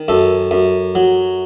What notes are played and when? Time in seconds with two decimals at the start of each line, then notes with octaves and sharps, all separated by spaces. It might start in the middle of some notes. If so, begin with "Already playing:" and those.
Already playing: D#3
0.08 F#2 A4
0.51 F#2
0.95 F#3